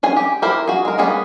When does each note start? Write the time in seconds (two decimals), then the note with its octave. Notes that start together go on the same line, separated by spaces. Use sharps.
0.03 C#4 G#4 G#5
0.16 G4
0.42 E4 G4 A#4 C5
0.68 F#4 G#4
0.85 G#3 A#4
0.98 G3 A#3 B3 C#4 G#4